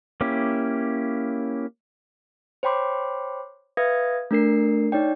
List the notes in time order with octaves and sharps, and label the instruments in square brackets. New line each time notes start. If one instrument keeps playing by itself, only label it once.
[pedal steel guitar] A#3 C#4 E4 G4
[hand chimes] C5 C#5 G5 B5 C6 D6
B4 E5 F5 D#6 G#6 A#6
A3 D4 A#4 C7
D#4 C#5 D5 G5